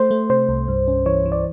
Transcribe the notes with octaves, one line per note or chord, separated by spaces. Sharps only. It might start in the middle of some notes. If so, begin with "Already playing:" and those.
Already playing: A3 C5
A3
C3 C5
C2
G2
C#4
E3 C#5
E3
D5